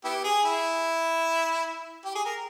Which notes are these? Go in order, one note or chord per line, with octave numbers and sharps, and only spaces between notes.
B3 E4 G4
G#4
E4
G4
G#4
A#4